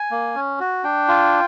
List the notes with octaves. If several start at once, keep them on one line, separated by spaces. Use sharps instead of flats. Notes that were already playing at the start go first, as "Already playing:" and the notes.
Already playing: G#5
A#3
C#4
F#4
D4 G5
F4